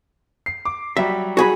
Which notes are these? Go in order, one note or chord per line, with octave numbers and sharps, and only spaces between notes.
C7
D6
F#3 G3 E5
F#4 G#4 B5